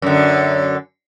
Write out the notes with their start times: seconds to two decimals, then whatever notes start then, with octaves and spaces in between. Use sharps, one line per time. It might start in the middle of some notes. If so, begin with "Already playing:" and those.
0.02 F#2 D3